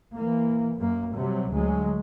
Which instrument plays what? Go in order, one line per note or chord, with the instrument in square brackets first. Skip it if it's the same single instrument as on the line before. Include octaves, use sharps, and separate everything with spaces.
[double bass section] E3 A#3
F#2 A#3
C3 F#3 G3
D2 F#3 G#3